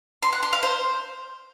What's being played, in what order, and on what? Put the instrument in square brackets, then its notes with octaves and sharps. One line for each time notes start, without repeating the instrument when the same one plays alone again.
[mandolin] C6
F#5
C6
F5
C5